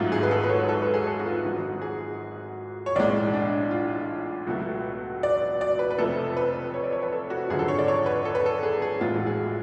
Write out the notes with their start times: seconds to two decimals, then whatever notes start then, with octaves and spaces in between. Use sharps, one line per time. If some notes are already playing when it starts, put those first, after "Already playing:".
Already playing: G#1 G#2 F#3 A3 F4
0.12 G#4
0.23 B4
0.31 A4
0.44 B4
0.49 C#5
0.69 A4
0.82 B4
0.94 G#4
1.07 A4
1.19 F#4
1.26 F4
1.44 G#1 G#2 F3 F#4
1.82 G#4
2.86 C#5
2.95 B1 A2 G#3 D5
3.34 D4
3.71 F4
4.46 C#2 B2 F#3 A3 F#4
5.23 D5
5.61 D5
5.79 B4
5.91 B4
5.98 F1 F2 F3 A3 A4
6.37 B4
6.74 C#5
6.83 D5
6.93 C#5
7.02 B4
7.12 A4
7.30 F#4
7.50 G#1 F#2 D3 F3 G#4
7.59 A4
7.68 C#5
7.79 D5
7.88 C#5
8.06 B4
8.25 A4
8.35 B4
8.46 A4
8.63 G#4
8.82 G#4
9.01 A1 A2 G#3 F4
9.14 F#4
9.27 G#4